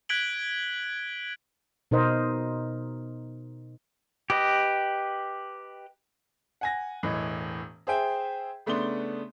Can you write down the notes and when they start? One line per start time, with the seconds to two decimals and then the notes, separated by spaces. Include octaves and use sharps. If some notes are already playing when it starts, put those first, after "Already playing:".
0.09 F#6 G#6 B6 D7 F#7 G7
1.91 B2 D#4 A#4 C5 D#5
4.30 G4 B4 D#5
6.61 F#5 G#5 A#6
7.03 E1 A2 E3 D#5
7.87 G#4 C5 E5 G5 G#5
8.66 C#3 A3 B3 D4 C6 G7